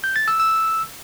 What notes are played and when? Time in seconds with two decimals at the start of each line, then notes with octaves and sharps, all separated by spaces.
0.04 G6
0.16 A6
0.28 E6
0.40 E6